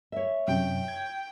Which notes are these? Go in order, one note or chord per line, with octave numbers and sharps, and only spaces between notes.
C#5 E5
F#2 C3 G5
G#6